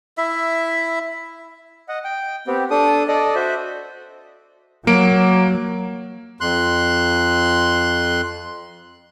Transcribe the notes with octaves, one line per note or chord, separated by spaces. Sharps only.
E4 E5
D#5 F#5
G5
B3 C4 G4
D4 A4 D#6
A4 D5 D#5
F#4 C5 E5
F#3 A#3 D7
F2 C6 F#6